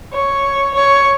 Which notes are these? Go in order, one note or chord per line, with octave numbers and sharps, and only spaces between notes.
C#5
C#5